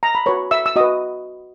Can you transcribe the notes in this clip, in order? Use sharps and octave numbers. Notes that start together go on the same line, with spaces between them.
A#5
B5
F#4 B4 C#5 C#6
E5 E6
E6
F#4 B4 D#5 D#6